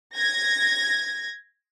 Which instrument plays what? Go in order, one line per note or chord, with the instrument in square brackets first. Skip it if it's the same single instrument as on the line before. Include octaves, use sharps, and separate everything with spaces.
[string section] G#6 A#6